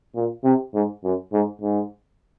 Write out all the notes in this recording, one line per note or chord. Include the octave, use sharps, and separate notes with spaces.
A#2
C3
G#2
F#2
G#2
G#2